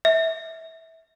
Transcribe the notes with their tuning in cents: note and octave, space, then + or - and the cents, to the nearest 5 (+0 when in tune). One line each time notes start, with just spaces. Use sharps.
E5 -20